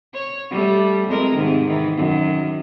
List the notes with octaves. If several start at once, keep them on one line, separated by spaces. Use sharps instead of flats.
C#5
G3 A3
F2 G#3 A#4
G#2 C3 D#3
D#3 E3
F#2 D#3